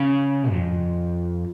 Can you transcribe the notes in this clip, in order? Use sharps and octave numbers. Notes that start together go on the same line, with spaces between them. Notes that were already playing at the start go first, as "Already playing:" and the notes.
Already playing: C#3
F2